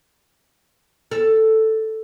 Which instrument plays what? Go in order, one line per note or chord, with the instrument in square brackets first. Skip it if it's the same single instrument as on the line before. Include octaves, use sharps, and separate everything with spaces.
[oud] A4